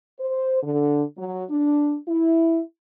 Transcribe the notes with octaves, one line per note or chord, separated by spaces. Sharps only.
C5
D3
F#3
D4
E4